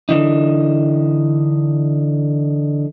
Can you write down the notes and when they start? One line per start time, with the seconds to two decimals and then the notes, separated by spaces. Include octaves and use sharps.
0.09 D3 E3 D#4